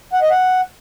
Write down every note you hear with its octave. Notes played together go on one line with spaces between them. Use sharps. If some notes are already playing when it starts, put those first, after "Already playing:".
F#5
D#5
F#5